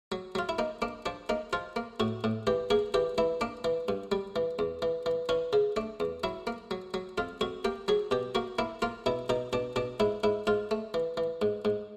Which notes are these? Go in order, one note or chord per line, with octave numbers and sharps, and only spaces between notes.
F#3
F#3 F4
E4
A#3 D#4
A#3 D4
F3 D4
A#3 D#4
F3 F4
A#3
A2 F#4
A2
E3 G4
A#3 G#4
E3 G4
E3 E4
A#3 D4
E3
G2
G3
E3
E2
E3
E3
E3 C#4
C#3
A3 D4
E2
F#3 E4
A#3
F#3
F#3
F2 F4
F2 F#4
A#3 G4
F#3 G#4
B2 G4
A#3 F#4
A#3 E4
A#3 F4
B2 E4
B2 D#4
B2 D4
B2 D4
G#2 E4
G#2 E4
G#2 F4
A3
E3
E3
G#2
G#2